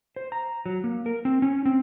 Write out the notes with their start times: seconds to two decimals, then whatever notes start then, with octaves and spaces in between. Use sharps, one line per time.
0.16 C5
0.32 A#5
0.66 F#3
0.84 A#3
1.06 A#4
1.25 C4
1.42 C#4
1.65 C4